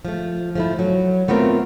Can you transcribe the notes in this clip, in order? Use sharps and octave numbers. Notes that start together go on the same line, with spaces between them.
F3 A3
F3 A3 E4
F#3
A3 B3 C4 F4 A#4